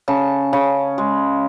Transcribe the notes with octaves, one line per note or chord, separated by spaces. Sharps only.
C#3 A5
C#3
G#3